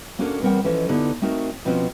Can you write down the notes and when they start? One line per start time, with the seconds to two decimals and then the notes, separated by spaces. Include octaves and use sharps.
0.19 A#3 C#4 D4 F#4 A4 A#4
0.42 E2 G3 C4 A#4 F#5 G5
0.64 E3 F3 C#4 A4 C#5 D#5
0.89 D3 B3 D#4 E4 G4
1.22 A3 C4 D#4 F#4 A#4
1.65 B2 F3 C4 C#4 F4 F#4